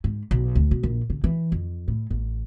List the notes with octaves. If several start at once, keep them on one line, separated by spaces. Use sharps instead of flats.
G#2
B1
D2
B2
A#1
D3
E3
F2
A2
A1